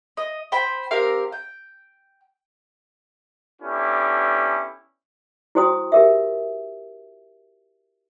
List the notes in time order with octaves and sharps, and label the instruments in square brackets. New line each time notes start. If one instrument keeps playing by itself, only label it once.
[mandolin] D#5
C5 G5 B5
C4 G4 A#4 F5
G5
[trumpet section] B3 C#4 D4 E4 G4 A4
[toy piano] E4 F#4 C5 G5 C6 D#6
G4 A#4 E5